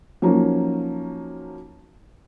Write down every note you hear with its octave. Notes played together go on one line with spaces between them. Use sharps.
F3 F#3 A#3 C#4 D#4